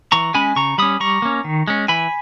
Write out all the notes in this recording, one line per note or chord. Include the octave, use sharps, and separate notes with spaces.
E3 A#5 C#6
G#3 C#4 G#5 B5
C#3 A#5 C#6
G3 C#4 B5 D#6
G3 A#5 C#6
A#3 C#4
D#3
G#3 C#4
E3 G#5 B5